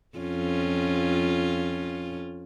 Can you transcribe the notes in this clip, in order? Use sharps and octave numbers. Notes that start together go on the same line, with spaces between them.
F2 C#4 F4